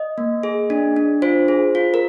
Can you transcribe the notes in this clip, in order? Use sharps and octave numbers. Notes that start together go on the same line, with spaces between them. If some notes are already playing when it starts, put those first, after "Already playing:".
Already playing: D#5
A#3
G#4
D4
D4
F4 C5
G#4
F4
A#4